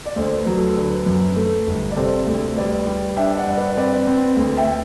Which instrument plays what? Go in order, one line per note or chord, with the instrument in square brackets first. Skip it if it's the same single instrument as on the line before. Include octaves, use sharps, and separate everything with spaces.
[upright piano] D5
[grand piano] D2 [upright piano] A4 C5
[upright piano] B4
[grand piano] F#3
[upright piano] A4
[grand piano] D3 [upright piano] B4
[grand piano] F#2
A3
G1
[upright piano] D5
[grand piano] C3 [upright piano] A4 C5
[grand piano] D2
[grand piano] G3 [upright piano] B4 D5
[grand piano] G3
[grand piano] D4 [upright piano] E5 G5
[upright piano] D5 F#5
[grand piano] G2
[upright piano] B4 D5
[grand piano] C4 [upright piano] B4 D5
[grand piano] C4
D2
[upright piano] E5 G5